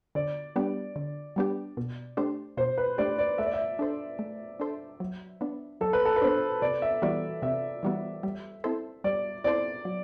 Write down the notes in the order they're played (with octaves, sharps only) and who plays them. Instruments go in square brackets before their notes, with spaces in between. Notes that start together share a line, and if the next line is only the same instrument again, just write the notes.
[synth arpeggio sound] D3 [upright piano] D5
[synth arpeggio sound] G3 B3 D4 G4
D3
G3 B3 D4 G4
B2
A3 D4 G4 C5
[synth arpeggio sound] B2 [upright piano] C5
[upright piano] B4
[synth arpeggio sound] A3 D4 G4 C5 [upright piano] D5
[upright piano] D5
[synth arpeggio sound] A3 [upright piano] E5
[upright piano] D5
E5
[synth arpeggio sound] D4 A4 C5
A3
D4 A4 C5
F#3
B3 D4
[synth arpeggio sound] F#3 [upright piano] A4
[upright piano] B4
A4
B4
[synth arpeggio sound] B3 D4 [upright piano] C5
[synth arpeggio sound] C3 [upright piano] D5
[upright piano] E5
[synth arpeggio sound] E3 G3 B3 F#4 [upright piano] D5
[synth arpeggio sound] C3 [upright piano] E5
[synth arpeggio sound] E3 G3 B3 F#4
G3
C4 E4 A4 C5
[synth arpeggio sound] G3 [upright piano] D5
[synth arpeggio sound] C4 E4 A4 C5 [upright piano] D5
[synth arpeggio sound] F#3